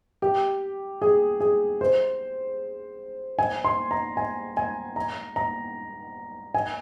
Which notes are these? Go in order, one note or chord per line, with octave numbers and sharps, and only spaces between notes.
G4
G#4
G#4
C5
G#5
C6
A#5
G#5
G#5
A#5
A#5
G#5